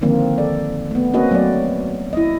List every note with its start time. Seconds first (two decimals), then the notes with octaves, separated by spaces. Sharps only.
0.01 D3 D#3 F3 A#3 C4
0.38 A4 D5
0.91 A3 B3
1.14 A#3 C4 C#4 F#4 B4 D#5
1.31 F#3 A3 B3 D5
2.13 E4 D#5